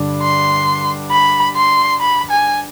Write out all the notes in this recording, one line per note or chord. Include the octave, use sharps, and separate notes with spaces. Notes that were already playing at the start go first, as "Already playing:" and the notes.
Already playing: G2 D3 G3 D4
C6
B5
C6
B5
G#5